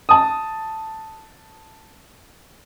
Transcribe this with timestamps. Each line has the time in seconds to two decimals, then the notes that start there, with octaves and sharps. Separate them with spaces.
0.09 A5 D#6